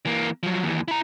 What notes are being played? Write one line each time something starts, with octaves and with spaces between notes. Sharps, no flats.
E3 A#3
F3 F#3
D#2 E3
E4 A#5